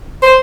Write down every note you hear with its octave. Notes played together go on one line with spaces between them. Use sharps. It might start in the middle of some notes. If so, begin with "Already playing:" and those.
C5